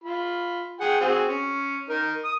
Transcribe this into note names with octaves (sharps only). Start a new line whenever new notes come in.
F4 B5
G#4 F#5 G5
C4 F#4 G#4
C#4
D#4 A#4
D#6